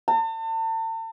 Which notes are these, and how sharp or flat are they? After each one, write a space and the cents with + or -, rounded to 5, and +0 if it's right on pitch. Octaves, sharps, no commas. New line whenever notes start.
A5 +40